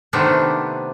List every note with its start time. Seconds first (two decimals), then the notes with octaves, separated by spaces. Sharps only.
0.13 C3 D#3 A3 B3 C4 D4